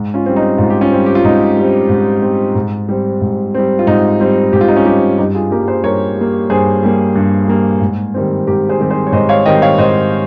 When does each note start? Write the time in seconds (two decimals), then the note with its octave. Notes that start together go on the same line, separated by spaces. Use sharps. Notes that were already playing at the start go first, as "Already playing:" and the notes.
Already playing: G#2
0.14 C#4 F4
0.26 G3 C4
0.36 D#4
0.58 G#2 F4
0.70 G4
0.81 C#4 F4
0.92 G3 C4
1.06 G4
1.15 F4
1.24 G#2 D#4
1.57 G3 C4
1.89 G#2
2.22 G3 C4
2.55 G#2
2.89 G3 C4
3.21 G#2
3.55 G3 C4
3.79 F4
3.87 G#2 D#4
4.20 G3 C4
4.53 G#2 G4
4.61 F4
4.68 D#4
4.76 C#4 F4
4.85 G3 C4 D#4 G4
5.18 G2 D#4 G4
5.35 F4 G#4
5.51 G3 A#3 G4 A#4
5.67 G#4 C5
5.84 G2 A#4 C#5
6.17 G3 A#3
6.50 G2 G#4 C5
6.83 G3 A#3
7.16 G2
7.48 G3 A#3
7.81 G#2
8.14 D#3 G3 C4
8.47 G#2 G4 A#4
8.69 G#4 C5
8.79 D#3 G3 C4
8.90 G#4 C5
9.07 C#5
9.12 G#2 C5 D#5
9.29 C#5 F5
9.46 D#3 G3 C4 D#5 G5
9.62 C#5 F5
9.78 G#2 C5 D#5